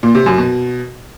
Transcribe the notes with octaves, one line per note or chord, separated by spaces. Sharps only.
A#2
C3
F#2
B2